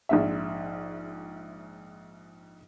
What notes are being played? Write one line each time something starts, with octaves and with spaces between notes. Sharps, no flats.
A#1 G#2 E5